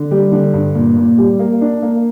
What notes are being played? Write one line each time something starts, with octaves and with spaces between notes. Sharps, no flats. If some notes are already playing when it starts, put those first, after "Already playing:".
Already playing: D3
G3
D3
G2
A#2
A#2
G3
A#3
D4
A#3